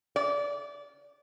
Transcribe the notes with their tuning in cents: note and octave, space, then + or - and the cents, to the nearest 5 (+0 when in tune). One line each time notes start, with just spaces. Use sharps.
D5 -25